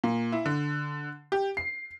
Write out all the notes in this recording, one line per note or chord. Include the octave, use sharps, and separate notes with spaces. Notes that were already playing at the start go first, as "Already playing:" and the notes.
A#2
E4
D3
G4
C7